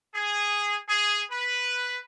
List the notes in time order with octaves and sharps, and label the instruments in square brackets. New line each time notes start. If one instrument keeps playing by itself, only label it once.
[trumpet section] G#4
G#4
B4